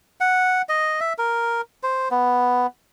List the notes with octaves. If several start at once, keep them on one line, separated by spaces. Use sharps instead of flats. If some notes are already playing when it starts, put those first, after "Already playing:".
F#5
D#5
E5
A#4
C5
B3